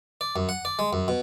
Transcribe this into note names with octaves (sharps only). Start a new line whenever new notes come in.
D5
F#2
F#5
D5
G#3
F#2
B2